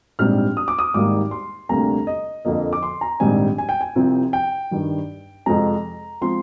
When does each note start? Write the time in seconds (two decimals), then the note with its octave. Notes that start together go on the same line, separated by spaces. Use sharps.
0.19 A#1 G#2 G3 C4 F6
0.57 D#6
0.68 D6
0.79 D#6
0.94 G#1 G#2 G3 A#3 D6
1.31 C6
1.69 D2 C3 G3 A#3 A#5
2.07 D#5
2.45 F2 D3 F3 A#3 D#5
2.73 D6
2.83 C6
3.01 A#5
3.20 A#1 G#2 D#3 G3 C4 G#5
3.58 G#5
3.69 G5
3.81 G#5
3.95 C2 C3 F3 C4
4.33 G5
4.71 G2 D#3 G3
5.46 F2 C3 F3 G#3 C4 A#5
6.21 F3 G#3 C4 C6